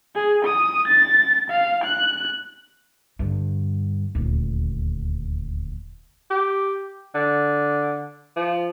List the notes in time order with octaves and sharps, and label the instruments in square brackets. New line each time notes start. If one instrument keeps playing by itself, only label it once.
[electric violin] G#4
D#6
A6
F5
F#6
[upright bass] G2 D3
D#1 D2
[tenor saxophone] G4
D3
F3